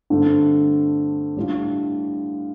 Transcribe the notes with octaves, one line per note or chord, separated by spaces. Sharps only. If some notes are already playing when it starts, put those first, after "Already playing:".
G2 D3 A3 C4
A2 G3 D4 F4